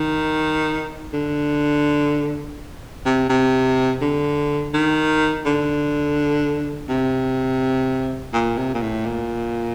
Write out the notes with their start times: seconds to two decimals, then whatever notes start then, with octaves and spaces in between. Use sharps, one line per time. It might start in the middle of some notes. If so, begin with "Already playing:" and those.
Already playing: D#3
1.14 D3
3.06 C3
3.30 C3
4.01 D3
4.74 D#3
5.46 D3
6.89 C3
8.33 A#2
8.57 C3
8.74 A#2
8.82 A2
9.05 A#2